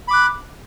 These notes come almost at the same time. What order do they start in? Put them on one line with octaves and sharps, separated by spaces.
B5 D6 F#6